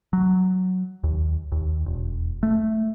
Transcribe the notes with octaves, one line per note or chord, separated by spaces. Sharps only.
F#3
D#2
D#2
E1
A3